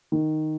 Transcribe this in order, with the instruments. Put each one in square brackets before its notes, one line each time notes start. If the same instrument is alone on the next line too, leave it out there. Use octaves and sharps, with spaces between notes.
[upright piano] D#3